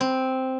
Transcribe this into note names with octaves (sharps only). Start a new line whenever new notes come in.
C4